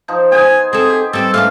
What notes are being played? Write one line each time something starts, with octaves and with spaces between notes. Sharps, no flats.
F3 D#4
B3 G#4 C5 G#5
C4 G#4 A4
G4
G3 C4 A4
E3 A3 A#3 C#4 D4 F5